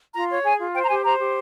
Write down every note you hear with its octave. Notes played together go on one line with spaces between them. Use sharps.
F4 A#5
C#5
G#4 G#5
F4
C5 G5
A#5
G4 G#5
C5 A#5
G4